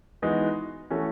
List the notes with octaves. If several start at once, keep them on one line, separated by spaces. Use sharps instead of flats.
E3 G#3 B3 D#4 F#4
E3 A3 C#4 F#4 A4